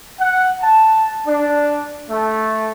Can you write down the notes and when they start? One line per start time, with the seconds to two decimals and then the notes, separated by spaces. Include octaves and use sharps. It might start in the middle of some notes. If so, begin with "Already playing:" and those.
0.20 F#5
0.61 A5
1.26 D4
2.10 A3